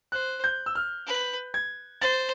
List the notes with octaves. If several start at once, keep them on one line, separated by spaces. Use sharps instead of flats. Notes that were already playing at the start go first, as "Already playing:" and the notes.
C5 F#6
G6
E6
F6
B4
G#6
C5 A6